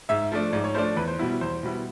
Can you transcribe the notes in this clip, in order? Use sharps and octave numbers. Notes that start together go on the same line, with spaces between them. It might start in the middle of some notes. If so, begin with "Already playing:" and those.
G#2 E5
F3 A3 D4
G#2 D5
C#5
F3 A3 D4 C5
E2 B4
C5
B2 G3 B3 E4
E2 C5
B2 G3 B3 E4